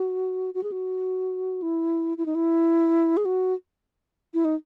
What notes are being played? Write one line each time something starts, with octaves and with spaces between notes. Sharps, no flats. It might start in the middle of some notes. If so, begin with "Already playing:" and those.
Already playing: F#4
F#4
G#4
F#4
E4
E4
D#4
E4
G#4
F#4
E4
D#4